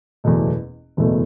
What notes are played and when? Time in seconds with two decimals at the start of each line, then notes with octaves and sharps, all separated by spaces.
0.24 F#1 E2 B2 A3
0.97 F#1 E2 B2 A3